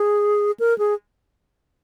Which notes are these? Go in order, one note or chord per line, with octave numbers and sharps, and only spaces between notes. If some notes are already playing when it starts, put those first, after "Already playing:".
Already playing: G#4
A#4
G#4